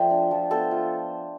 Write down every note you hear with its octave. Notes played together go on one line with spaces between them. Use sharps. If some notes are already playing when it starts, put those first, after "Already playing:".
Already playing: F3 A3 C5 D5 E5 G5
D4
F3
B3 A4 C5
F4